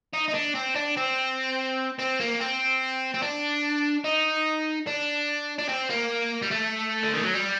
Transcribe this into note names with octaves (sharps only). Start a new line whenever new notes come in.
D#4
D#4
D4
C4
D4
C4
C4
A#3
C4
C4
D4
D#4
D4
D4
C4
A#3
G3
A3
D3
D#3
F#3
G3